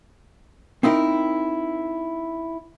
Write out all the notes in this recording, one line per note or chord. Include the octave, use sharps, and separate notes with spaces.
C4 D#4 E4 A#4